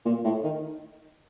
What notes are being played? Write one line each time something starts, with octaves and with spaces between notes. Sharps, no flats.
A#2
A2
D#3